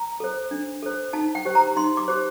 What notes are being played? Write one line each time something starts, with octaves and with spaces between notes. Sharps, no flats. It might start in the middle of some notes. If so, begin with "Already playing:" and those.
Already playing: A#5
A4 C5
D4
A4 C5
D#4 A5
G5
G4 C5
A#5
D#4 C6
D6
G4 C5